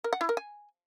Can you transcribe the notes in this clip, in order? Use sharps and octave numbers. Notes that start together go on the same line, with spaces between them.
A#4
F#5
E4
A#4
G#5